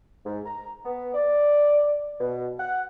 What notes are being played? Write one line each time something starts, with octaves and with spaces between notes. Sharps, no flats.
G#2
A#5
B3
D5
B2
F#5